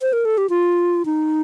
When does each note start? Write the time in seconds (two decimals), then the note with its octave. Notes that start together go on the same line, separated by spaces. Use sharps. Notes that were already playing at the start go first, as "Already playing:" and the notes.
0.01 C5
0.13 A#4
0.25 A4
0.38 G4
0.50 F4
1.06 D#4